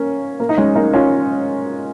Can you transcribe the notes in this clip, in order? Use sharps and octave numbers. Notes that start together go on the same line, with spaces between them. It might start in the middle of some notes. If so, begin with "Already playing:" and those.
Already playing: A#3 C#4
A#3
D#4
G#3 C#4
A#3 D#4
C#4 F4